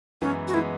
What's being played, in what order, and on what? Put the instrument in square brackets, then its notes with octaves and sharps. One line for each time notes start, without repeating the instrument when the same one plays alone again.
[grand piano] F#2 E3 G#3 B3 [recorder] C#4
[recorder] F#4
[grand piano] E3 G#3 B3 [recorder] E4